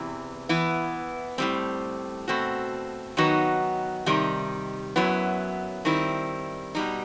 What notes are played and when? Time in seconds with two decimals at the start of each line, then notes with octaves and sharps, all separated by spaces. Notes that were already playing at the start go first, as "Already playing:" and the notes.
Already playing: E2 C3 E3
0.49 E3 B3 E4
1.38 A2 G3 C4
2.28 B2 A3 C4 F#4
3.17 D#3 F#3 B3 D#4 F#4
4.06 C3 D#3 G3 D#4
4.96 F#2 F#3 B3 E4
5.85 D#3 G3 C4 E4
6.75 B2 G3 D#4